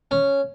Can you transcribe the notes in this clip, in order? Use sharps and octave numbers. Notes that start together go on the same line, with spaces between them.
C#4